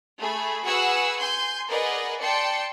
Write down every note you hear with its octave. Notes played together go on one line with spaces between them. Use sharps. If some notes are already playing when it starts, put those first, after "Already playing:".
A3 G#4 B5
F#4 G#4 B4 F#5 G#5 E6
G#5 C6 G6
G#4 A#4 B4 D5 D#5 F#5
D5 G5 A5 C6 C#7